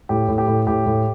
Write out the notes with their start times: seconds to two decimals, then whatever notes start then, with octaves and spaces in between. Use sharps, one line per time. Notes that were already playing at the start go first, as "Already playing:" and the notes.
0.09 A2 G4
0.28 A2
0.38 G4
0.48 A2
0.67 A2 G4
0.86 A2